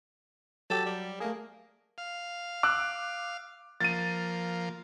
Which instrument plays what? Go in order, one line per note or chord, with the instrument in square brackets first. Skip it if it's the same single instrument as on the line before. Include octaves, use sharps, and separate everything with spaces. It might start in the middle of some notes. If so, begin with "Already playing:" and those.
[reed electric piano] F#3 G4 [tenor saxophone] A4
[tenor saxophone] G3
[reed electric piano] A3 G#4 [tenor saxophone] A#3
[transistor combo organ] F5
[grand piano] D6 E6 F#6
[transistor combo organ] F3 A#3 [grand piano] A6 D#7